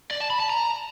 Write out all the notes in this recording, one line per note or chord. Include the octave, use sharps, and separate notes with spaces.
D5
A5
B5
A5
A#5